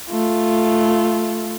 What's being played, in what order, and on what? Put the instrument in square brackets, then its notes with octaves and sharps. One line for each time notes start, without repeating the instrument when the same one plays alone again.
[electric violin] A3 F4